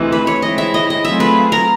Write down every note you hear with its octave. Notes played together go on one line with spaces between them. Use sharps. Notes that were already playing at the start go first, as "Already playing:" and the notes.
Already playing: D2 C3 E3 G#3
B4
C#5
E3 G#3 C4 E4 D#5
E5
D#5
D#5
F#3 A3 C4 F4 G#4 E5
B4
A#4